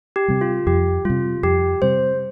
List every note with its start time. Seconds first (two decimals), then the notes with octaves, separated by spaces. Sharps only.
0.16 G4
0.28 C3 G3
0.41 F4
0.67 F2 G4
1.05 C3 G3 F4
1.43 F2 G4
1.82 C3 G3 C5